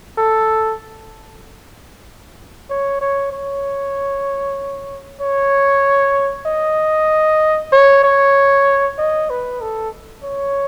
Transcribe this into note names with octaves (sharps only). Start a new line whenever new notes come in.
A4
C#5
C#5
C#5
C#5
D#5
C#5
C#5
D#5
B4
A4
C#5